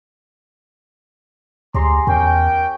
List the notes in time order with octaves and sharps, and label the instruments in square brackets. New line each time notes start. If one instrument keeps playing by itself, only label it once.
[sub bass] D2 [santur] G4 G#4 D5 [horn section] A#5 C6
[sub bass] E2 [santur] C#4 [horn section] A#4 G5